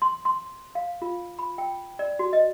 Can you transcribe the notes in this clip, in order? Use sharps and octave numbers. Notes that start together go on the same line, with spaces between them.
C6
C6
F5
F4
B5
G5
D5
F#4
D#5